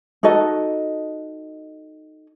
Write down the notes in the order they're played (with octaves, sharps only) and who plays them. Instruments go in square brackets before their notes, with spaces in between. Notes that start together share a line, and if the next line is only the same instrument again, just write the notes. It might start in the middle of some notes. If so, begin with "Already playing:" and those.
[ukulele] D#4 F#4 A4 D#5